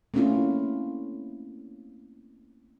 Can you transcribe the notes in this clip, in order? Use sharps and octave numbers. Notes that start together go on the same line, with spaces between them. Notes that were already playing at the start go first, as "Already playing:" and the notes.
A3 A#3 C4 C#4 E4 F4